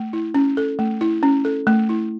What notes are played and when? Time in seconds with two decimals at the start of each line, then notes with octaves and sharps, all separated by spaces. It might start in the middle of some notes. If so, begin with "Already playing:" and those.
Already playing: A3
0.13 E4
0.34 C#4
0.57 A4
0.79 A3
1.01 E4
1.23 C#4
1.45 A4
1.67 A3
1.89 E4